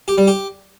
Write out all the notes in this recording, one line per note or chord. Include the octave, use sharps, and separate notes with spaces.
G4
G3
G4